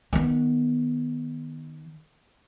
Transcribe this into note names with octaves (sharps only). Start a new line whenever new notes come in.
D#3 B3